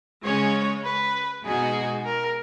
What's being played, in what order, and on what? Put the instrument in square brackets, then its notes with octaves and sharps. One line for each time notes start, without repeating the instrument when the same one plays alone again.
[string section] C#3 G#3 C#4 [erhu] C#5
[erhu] B4
[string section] B2 G#3 D#4 F#4 [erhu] G#4
[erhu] A#4